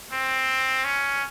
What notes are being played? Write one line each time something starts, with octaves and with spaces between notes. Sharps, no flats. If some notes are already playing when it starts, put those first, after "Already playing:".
C4
C#4